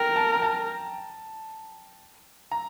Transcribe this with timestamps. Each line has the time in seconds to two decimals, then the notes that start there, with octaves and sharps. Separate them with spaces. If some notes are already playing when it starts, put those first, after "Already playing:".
Already playing: A#4 G5
0.16 A5
0.33 A#5
0.42 A5
2.51 A#5